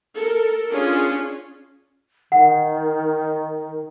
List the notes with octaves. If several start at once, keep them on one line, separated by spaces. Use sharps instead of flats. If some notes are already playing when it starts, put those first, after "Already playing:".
A4 A#4
C#4 D4 F4 G#4
D#3 F#5